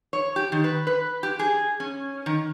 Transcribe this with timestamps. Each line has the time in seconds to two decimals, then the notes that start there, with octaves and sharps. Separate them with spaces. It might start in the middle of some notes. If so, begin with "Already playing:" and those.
0.13 C#5
0.36 G4
0.52 D#3
0.64 B4
0.87 B4
1.23 G4
1.39 G#4
1.80 C#4
2.26 D#3